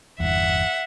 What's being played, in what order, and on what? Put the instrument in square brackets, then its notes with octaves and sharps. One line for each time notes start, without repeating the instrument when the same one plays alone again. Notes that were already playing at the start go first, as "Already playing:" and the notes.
[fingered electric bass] G1 E2 [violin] E5 F#5